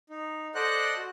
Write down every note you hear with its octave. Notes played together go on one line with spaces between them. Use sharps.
D#4
A4 C5 D5 D#5 F#5 F#6
F#4